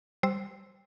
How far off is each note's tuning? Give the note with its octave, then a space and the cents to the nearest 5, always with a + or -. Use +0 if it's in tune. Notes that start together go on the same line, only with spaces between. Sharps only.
G3 +0 C5 +0 E6 +0